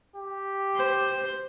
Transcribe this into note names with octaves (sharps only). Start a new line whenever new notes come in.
G4
C5